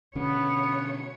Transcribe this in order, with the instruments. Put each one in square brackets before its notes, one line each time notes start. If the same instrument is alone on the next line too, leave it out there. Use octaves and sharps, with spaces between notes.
[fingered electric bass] B2 D3 C#4 [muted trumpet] B3 [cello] C#5